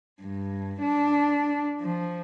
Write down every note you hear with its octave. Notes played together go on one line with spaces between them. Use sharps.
G2
D4
F3